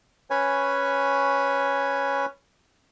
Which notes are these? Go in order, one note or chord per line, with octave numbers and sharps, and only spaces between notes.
C#4 B4 C#5 G#5